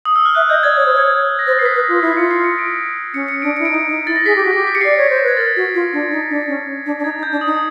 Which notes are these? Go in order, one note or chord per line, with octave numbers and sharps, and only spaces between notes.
D#6
E6
F6
E5 F#6
D#5 G6
D5 G#6
C#5 G#6
C5
C#5
A#6
C5 A6
B4 C7
B6
B4
A#6
F4
E4 C7
F4 C#7
C7
C#7
D7
C#4 C#7
C#7
D4 D7
E4 C#7
D7
D#4
C#7
D#4
E4 A6
A#6
G#4 B6
G4 A#6
F#4
G4 B6
B6
C#7
D5 C7
C#5
C5
B4 G#6
A#4 A6
F#4
F4
D4
D#4
D4
C#4
D4
D4
D#4 G#6
D#4
G6
D4
D#6
D#4